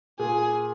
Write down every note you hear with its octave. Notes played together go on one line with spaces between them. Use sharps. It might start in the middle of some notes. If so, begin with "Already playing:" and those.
A#2 G#4